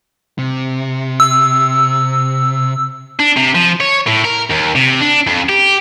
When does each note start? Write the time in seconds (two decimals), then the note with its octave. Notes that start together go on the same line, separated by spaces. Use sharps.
0.38 C3
1.20 E6
3.19 D4
3.37 C3
3.55 F3
3.80 C#5
4.07 A2
4.25 A#4
4.51 D#2
4.76 C3
5.01 D4
5.27 F2
5.49 G4